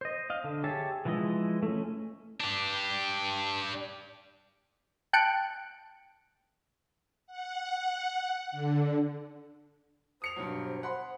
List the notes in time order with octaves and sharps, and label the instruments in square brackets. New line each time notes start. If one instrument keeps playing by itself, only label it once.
[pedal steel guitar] C5 D#5
D#5 F5
D3
G4 G#4 C#5 E5 A5
E3 F3 G#3 E4 D#5
A3 C#4
[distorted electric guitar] D4 G4
[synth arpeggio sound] G5 A5 F#6 C#7 D7
[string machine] F#5
D3
[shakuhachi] C5 [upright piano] D#6 C#7 F7
[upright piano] G2 B2 F#3
F#5 B5 C6